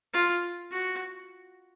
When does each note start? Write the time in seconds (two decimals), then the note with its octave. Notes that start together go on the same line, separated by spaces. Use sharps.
0.14 F4
0.71 F#4